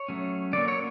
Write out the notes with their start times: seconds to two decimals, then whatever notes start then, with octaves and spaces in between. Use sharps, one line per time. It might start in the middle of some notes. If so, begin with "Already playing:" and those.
Already playing: C#5
0.08 F#3 A3 C#4
0.53 D3 F#3 A#3 D5
0.68 C#5